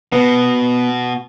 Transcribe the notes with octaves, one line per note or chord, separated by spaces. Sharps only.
B2 B3